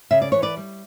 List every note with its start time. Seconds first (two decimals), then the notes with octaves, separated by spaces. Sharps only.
0.11 C#3 E5
0.22 D5
0.32 E3 C#5
0.42 B4 D5
0.57 G3